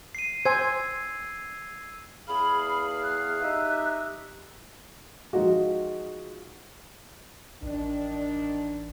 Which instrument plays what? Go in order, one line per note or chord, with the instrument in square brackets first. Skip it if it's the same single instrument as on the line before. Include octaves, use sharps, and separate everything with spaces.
[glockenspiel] C7 D#7
[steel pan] C5 G#5 [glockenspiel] E6 G#6
[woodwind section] E2 G#4 F5 [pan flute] B5
[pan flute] F#6
[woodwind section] D#4 G4 E5
[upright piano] F3 G#3 D#4 F4 F#4
[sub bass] A1 [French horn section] D#3 D4